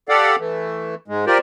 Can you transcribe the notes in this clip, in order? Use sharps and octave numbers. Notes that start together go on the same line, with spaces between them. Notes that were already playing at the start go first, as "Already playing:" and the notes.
G4 A4 D5 F5 F#5
E3 A3
G#2 G#3
F4 G4 A#4 C5 D5